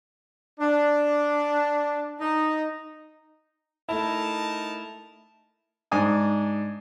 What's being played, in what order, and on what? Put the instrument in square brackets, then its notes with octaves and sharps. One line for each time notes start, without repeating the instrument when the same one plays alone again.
[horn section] D4
D#4
[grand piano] A3 E4 [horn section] D#4 A#4 A5
[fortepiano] G#2 D4 G#5 D#6